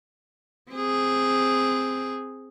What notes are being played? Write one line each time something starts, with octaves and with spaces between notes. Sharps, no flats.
C4 G#4